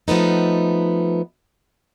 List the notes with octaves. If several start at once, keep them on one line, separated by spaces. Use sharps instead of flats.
F3 A3 B3 D#4